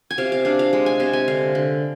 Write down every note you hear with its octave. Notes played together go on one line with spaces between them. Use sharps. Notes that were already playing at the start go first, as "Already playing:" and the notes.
G#5
C3 F5
F5
D4 F5
F5
G#3
G#5
C3 F5
G#5
D3 F5
D3